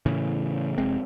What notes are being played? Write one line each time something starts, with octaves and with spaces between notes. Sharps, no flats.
A2 C#3 E3
F1 C3 G#3 C4